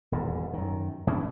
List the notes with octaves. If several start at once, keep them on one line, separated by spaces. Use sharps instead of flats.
D#1 E2 G#2
F#2 D#3
B2 E3 C#4 D4